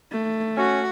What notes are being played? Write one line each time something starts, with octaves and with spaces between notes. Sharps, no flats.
A3
C#4 F#4 F#5